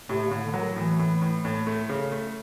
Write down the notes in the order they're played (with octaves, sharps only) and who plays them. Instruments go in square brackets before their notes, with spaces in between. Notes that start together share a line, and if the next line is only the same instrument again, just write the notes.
[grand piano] A2 [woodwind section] C3
[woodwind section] C#3
[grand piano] A2 [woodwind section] D3
[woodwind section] D3
[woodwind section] D#3 [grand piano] F#3
[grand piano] A2 [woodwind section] E3
[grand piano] A2
A2
A2
A3
C#3
A3